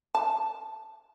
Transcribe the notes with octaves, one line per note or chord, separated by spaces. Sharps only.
A5